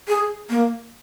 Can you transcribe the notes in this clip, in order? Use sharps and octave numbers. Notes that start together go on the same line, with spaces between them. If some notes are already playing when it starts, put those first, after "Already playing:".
G#4
A#3